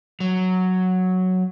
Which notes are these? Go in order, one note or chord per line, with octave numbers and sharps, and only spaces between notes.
F#3